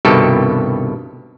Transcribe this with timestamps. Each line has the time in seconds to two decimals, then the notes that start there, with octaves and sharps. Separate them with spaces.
0.05 C2 G2 B2 D#3 G4 A4